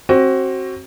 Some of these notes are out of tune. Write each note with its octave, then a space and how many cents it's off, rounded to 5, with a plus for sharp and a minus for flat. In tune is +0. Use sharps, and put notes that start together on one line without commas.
C4 +25 F#4 +20